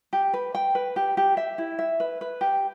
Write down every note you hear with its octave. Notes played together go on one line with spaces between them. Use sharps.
G4
B4
G5
B4
G4
G4
E5
E4
E5
B4
B4
G4